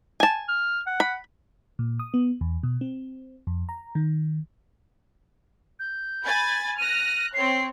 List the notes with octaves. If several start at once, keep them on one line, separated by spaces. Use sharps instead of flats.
G#5 A5
F6
F#5
B5
A#2
D#6
B3
E2
B2
C4
F2
A#5
D#3
G6
G#5 B5 A6
F6 F#6 A#6 D#7
C4 C#5 C7